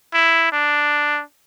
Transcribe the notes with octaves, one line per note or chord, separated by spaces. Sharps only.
E4
D4